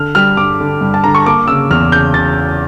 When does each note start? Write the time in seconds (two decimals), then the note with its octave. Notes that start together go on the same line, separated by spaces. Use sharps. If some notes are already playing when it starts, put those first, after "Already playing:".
Already playing: D3 F6
0.15 G3 F6
0.37 G2 D6
0.60 D3
0.81 G2
0.94 A5
1.04 D3 A#5
1.15 C#6
1.26 A#3 D6
1.48 C#3 E6
1.71 E2 F6
1.92 C#3 G6
2.14 C#3 A6